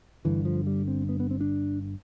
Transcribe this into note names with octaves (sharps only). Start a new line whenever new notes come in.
G1 G2 D3 E3
F3
G3
C4
B3
B3
C4
D4